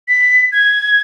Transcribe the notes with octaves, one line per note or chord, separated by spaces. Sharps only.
B6
G#6